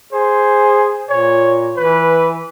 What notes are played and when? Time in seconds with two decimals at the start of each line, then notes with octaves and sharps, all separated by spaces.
0.12 G#4 C5
1.09 A#2 C#5
1.76 E3 B4